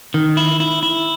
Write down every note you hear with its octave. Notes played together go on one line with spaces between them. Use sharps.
D#3
E4
E4
E4